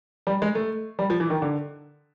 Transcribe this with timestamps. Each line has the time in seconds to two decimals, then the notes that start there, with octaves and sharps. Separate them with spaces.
0.27 G3
0.42 G#3
0.55 A3
0.99 G3
1.10 F3
1.20 E3
1.30 D#3
1.42 D3